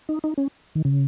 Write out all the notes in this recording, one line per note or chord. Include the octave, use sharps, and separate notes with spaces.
D#4
D#4
C#4
D#3
C#3